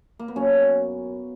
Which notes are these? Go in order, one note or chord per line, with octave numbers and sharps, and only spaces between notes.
A#3
B3
F#2 C#4